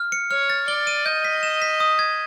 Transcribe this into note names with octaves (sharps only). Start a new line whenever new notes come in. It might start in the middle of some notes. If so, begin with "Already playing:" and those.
Already playing: F6
C#7
C#5 F6
A6
D5 G7
D#7
D#5 G6
B6
E7
B6
D#6
G#6